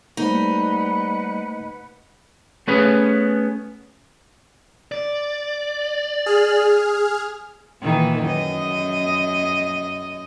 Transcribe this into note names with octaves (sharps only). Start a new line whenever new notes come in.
G3 A3 A#3 D#4 B4 C5 F#5
A3 B3 C#4 G#4 B4
D5
G#4 F6
A#2 D#3 E3
F#2 D#5